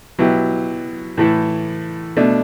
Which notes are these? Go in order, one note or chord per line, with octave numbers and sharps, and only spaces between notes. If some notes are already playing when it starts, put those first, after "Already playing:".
B2 F#3 B3 E4 G4
A2 E3 A3 E4 A4
B2 A3 D4